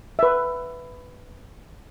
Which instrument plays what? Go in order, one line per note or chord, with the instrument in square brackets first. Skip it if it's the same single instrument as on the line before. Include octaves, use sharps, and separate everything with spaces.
[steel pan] B4 E5